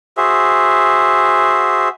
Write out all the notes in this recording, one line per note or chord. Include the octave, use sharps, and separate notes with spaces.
F#4 G#4 C5 E5